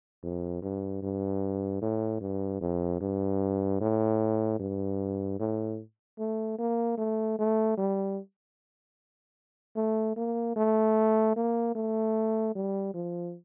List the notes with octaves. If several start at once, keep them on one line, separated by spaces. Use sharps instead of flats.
F2
G2
G2
A2
G2
F2
G2
A2
G2
A2
A3
A#3
A3
A3
G3
A3
A#3
A3
A#3
A3
G3
F3